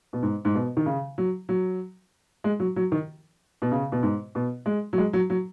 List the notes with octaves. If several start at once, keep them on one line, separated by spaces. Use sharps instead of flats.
B2
G#2
G#2
B2
D#3
C#3
F#3
F#3
G#3
F#3
F#3
D#3
B2
C#3
B2
G#2
B2
G#3
F#3
G#3
F#3
F#3